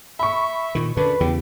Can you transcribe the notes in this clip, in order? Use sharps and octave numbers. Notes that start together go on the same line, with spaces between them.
E5 B5 C#6
A#2 D#3
F#2 D3 D4 B4
E2 C#3 G4